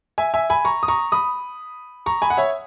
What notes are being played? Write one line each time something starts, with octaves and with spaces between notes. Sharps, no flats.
E5 G#5
E5 G#5
G#5 B5
A#5 C#6
D#6
A#5 C#6
B5 D#6
A#5 C#6
G#5 B5
F#5
C#5 E5